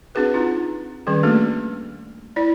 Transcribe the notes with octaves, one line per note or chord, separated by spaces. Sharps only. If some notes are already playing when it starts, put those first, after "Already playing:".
C4 D4 F#4 G#4 B4
C4 D#4 F4
D#3 G3 C#4 G#4
A3 A#3 D4 F#4 A4
E4 D5